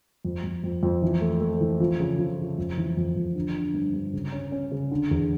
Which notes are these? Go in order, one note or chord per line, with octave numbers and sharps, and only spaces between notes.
F2
F2
F2
F2
E3
A3
A3
E3
F3
C#3
F3
C#3
F2
E3
F2
F2
D3
D3
G2
G2
C#3
C#4
C#4
C#3
D3
E2